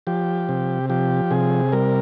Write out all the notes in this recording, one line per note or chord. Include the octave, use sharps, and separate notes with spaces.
F3 G4
C3
F3 G4
C3 G#4
G3 A#4